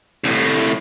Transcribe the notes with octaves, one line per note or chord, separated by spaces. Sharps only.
C2 A2